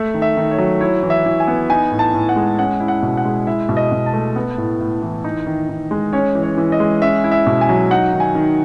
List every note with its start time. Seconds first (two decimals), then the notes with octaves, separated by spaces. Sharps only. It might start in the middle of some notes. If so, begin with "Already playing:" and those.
Already playing: A3 E5
0.14 D#3
0.22 E5
0.37 D#3
0.51 C#5
0.58 F#3
0.81 E4 C#5
1.03 E3
1.10 E5
1.26 E3
1.40 G#5
1.48 B3
1.70 D#4 G#5
1.91 A2
1.99 A5
2.14 A2
2.29 F#5
2.36 G#3
2.58 C#4 F#5
2.80 E4
2.88 F#5
3.03 B2
3.17 F#5
3.25 G#3
3.47 E4 E5
3.69 B2
3.77 D#5
3.92 B2
4.06 A5
4.13 A3
4.36 B3
4.58 A2
4.80 A2
5.03 E3
5.24 D#4
5.47 D#3
5.69 D#3
5.91 G#3
6.13 C#4 C#5
6.35 E3
6.43 C#5
6.58 E3
6.72 D#5
6.80 G#3
7.02 C#4 E5
7.24 E4
7.31 E5
7.46 B2
7.61 G#5
7.69 F#3
7.91 D#4 F#5
8.13 D#3
8.20 G#5
8.35 D#3